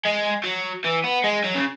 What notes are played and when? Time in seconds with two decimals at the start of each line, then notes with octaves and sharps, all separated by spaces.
0.05 G#3
0.44 F#3
0.84 E3
1.04 B3
1.24 G#3
1.44 F#3
1.54 C#3